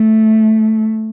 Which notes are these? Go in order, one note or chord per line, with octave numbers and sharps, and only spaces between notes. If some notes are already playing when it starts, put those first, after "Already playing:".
Already playing: A3